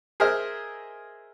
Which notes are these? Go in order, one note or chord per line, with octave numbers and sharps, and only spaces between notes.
G#4 A#4 C5 D#5 E5 F6